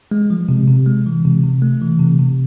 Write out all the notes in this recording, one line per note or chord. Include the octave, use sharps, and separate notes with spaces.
G#3
F3
C3
C3
G#3
E3
C3
C3
A3
E3
C3
C3